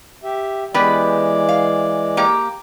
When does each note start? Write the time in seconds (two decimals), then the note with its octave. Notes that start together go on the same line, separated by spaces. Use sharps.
0.24 G4 E5
0.74 E3 G#3 B3 G4 B4 D5
1.49 F5
2.17 A#3 G4 A#5